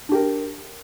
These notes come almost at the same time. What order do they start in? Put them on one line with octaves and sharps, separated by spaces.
D4 G4 A#4